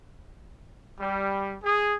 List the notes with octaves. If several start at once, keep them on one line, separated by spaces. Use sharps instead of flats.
G3
G#4